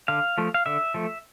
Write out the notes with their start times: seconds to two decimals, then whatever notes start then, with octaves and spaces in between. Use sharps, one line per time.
0.08 D3 F5
0.38 F3 A3
0.54 F5
0.66 D3 E5
0.94 F3 A3